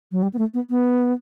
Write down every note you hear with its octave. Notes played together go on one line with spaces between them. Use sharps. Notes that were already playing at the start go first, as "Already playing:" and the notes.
F#3
G3
B3
A3
B3
B3